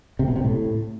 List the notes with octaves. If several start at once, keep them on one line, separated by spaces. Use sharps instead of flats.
C3
B2
C3
A2